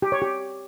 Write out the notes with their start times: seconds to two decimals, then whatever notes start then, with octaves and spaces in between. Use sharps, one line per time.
0.02 G4
0.12 C#5
0.22 G4